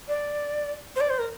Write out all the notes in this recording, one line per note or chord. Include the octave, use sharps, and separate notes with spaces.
D5
C5
D5
C5
A#4